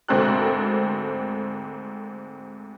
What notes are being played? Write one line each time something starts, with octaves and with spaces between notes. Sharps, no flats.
D2 G#2 C4 A4 A#4 F#6